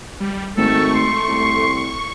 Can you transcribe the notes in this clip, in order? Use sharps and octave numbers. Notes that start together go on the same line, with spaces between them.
G3
G#1 A3 A4 C#6
C6
C2